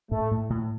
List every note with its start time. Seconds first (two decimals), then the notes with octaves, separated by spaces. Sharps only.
0.11 A2 A3
0.31 A2
0.50 A2